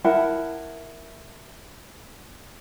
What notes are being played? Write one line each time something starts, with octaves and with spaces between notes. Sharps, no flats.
E4 A#4 F#5 A5